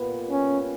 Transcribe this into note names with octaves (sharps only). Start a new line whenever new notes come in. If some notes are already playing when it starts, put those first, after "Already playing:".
Already playing: A#2 G3 B3
C#4